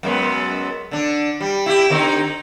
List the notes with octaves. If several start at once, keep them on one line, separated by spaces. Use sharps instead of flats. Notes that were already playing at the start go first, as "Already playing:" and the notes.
F#2 G#3 B3
D3 D4
G3
E4 F#4 G4
D3 C4 D#4